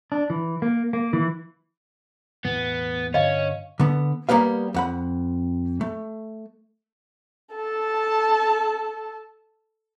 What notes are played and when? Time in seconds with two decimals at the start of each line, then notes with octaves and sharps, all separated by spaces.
0.12 D4
0.30 E3
0.62 A#3
0.93 A#3
1.13 E3
2.45 E1 A2 E3 B3
3.14 G2 D3 C#4 D#5 F5
3.80 D3 B3
4.29 G3 A#3 B3 B4 F5
4.74 F2 F#5 B5
5.81 A3
7.55 A4 A5